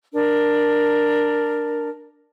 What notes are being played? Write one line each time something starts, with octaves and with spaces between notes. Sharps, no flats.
D4 A#4